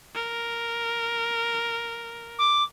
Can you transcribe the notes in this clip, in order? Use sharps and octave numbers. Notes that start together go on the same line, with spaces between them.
A#4
D6